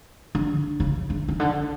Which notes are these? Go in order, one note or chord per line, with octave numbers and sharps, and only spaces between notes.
D3
C#3
D3
C#3
D3